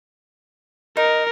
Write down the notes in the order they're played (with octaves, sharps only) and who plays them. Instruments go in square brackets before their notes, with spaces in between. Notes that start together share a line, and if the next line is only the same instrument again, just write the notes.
[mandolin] D#4 [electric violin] A#4